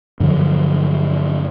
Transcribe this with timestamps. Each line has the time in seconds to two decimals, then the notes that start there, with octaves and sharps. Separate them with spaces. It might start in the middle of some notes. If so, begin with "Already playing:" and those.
0.20 G2 D3 F3 F#3